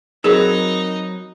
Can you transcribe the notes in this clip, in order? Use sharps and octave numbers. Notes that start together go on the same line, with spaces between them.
F#3 C4 D#4 G#4 A#4 B4